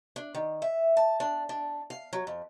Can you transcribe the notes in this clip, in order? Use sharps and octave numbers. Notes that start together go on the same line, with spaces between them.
D4
D#3
E5
A5
D4
D4
F5
F#3
F2